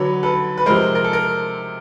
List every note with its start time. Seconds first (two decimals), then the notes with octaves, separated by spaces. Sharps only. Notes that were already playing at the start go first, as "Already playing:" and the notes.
Already playing: D3 F#3 B4 C#5
0.23 A4 B4
0.57 B4
0.66 C3 F3 G#3 A#4 C5
0.95 A#4
1.04 A4
1.13 A#4